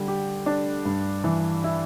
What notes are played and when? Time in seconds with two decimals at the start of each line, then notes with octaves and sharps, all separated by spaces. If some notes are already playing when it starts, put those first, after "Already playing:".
Already playing: D3 G3
0.08 G4
0.46 D4
0.85 G2
1.24 E3
1.64 E4